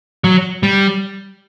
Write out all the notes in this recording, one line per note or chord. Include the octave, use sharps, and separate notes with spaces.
F#3
G3